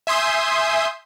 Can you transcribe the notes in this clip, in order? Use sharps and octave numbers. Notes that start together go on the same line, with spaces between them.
E5 G#5 C6 D#6 G6